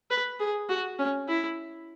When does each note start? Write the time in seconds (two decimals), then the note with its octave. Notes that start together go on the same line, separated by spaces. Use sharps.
0.11 B4
0.40 G#4
0.69 F#4
0.98 C#4
1.28 E4